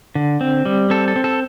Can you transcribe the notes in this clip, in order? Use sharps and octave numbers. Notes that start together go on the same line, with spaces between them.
D3
C4
G3
C4 A4
A4
C4
A4